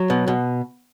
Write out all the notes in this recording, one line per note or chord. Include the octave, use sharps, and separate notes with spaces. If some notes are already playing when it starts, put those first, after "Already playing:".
Already playing: F#3
B2
B2